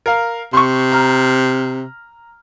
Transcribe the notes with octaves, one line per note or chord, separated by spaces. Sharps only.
A#4 F5
C3 C6 C#6
A#5 F6